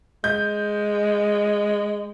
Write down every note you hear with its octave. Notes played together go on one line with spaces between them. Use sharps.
G#3 G6